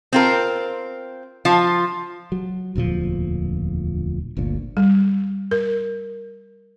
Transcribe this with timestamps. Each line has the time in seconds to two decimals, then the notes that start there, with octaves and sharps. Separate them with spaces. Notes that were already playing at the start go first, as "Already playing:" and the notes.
0.13 C4 F4 A#4
1.45 F3 F4
2.32 F#3
2.75 E1 D2 A#2 F3
4.37 G1 D2 A#2
4.77 G3
5.51 A#4